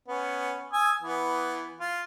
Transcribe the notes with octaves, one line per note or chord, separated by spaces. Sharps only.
B3 C#4
G#5 D#6 E6
E3 B3
F4